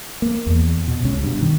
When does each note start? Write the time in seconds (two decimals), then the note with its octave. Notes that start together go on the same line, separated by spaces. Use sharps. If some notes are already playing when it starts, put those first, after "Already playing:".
0.22 A#3
0.46 E2
0.88 B2
1.02 D1 C#2 C#4
1.24 G2 B2
1.41 D#3